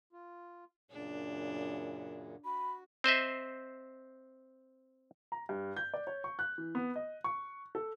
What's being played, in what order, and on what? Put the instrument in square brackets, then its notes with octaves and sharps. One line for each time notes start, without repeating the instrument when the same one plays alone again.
[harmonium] F4
[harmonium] F#2 A#2 C#3 [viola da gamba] D4
[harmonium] F#4 [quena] B5
[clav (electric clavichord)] C4 C5 D#5 E5
[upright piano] A#5
G2
G6
D5
C#5
C#6
F#6
E3
B3
D#5
C#6
A4